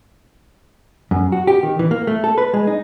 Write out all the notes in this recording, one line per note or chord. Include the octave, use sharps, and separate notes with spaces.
F#2
F#4
G4
D#3
E3
A#3
A3
A4
B4
G#3
D#4